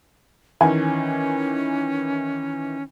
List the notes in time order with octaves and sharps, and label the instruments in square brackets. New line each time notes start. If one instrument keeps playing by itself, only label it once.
[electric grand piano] D#3 E3 [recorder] C#4 [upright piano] G#5